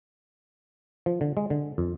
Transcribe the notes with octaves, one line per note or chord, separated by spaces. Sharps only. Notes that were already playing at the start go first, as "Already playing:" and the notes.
F3
D3
G#3
D3
F2